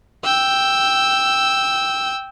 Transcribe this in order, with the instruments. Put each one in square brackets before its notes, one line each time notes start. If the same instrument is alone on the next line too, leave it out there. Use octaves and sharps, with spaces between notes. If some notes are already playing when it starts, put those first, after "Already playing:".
[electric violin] G5 E6